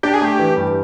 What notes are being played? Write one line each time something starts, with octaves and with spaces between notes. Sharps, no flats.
D4 G4
G#4
A3 G4
E3
G2